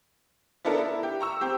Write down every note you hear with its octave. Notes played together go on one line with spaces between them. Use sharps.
B3 D4 E4 A4 A#4
E4
G4
A#5 C#6 E6
C4 G4